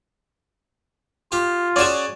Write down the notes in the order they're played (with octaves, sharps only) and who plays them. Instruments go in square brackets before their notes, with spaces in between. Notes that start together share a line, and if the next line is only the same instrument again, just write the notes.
[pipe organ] F4 [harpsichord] G4
[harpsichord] C#4 F#4 G#4 [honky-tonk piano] D5 E7